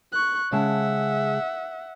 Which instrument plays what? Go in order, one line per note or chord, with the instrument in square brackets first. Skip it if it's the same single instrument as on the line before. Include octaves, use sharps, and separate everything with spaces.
[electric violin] C#6 F#6
[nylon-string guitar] C#3 G#3 A5 [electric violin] E5 F#5